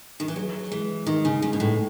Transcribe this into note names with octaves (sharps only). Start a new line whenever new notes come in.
D#3
E3
F#3 G#4
E3 G#3
D#3 D#4
C#3
C#3 G#3
B2
A2